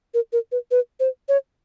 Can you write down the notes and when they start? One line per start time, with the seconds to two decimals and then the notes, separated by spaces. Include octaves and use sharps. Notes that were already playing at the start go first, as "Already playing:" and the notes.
0.14 A#4
0.33 A#4
0.52 B4
0.71 B4
1.00 C5
1.29 C#5